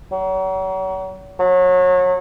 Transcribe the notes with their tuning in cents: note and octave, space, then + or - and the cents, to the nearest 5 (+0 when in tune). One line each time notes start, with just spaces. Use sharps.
F#3 +40
F#3 -30